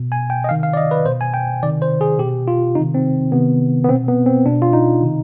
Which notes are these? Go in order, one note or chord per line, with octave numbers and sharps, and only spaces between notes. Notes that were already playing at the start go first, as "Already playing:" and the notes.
Already playing: B2
G#5
G5
D#5
C3 D#3 F5
F5
D5
D#5
B4
B2 C5
G#5
G5
C3 D#3 D5
C5
G#4
B2 G4
F4
C3 D#3 D#4
C4
C3 D#3 B3
B3
B2 C4
B3
C4
B2 D4
F4
D#4
C3 D#3